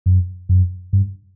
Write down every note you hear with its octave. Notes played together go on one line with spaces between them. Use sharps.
F#2
F#2
G2